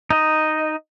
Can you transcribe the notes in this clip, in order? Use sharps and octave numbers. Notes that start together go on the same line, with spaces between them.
D#4 D#5